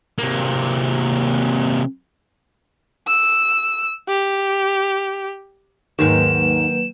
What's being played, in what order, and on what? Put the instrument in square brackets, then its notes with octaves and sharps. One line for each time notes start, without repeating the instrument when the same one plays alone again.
[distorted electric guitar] C3 A#3
[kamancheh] E6
G4
[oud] D#2 G#2 [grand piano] D#3 [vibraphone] F#3 A#3 B4 [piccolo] E7